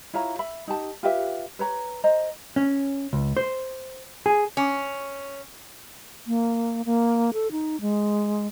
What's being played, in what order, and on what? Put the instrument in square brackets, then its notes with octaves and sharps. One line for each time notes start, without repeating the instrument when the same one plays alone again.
[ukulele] E4 F4 C#5 A#5
E5 B5
D#4 G4 A5
F4 G4 B4 E5
B4 C#5 A#5
C5 D#5 A#5
[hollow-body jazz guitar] C#4
C#2
C5
G#4
[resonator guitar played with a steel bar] C#4
[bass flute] A#3
A#3
A4
D#4
G#3